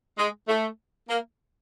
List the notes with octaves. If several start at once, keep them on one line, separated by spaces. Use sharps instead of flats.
G#3
A3
A#3